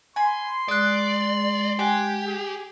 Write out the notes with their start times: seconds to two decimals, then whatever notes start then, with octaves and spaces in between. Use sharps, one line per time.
0.16 G#5 B5 C6
0.68 G#3 G#4 D5 F#6
1.79 G4 F#5 G#5
2.27 G#4